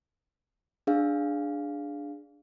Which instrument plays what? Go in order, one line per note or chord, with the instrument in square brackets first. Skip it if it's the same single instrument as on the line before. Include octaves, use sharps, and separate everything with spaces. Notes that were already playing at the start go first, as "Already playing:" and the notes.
[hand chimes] D4 G#4 F5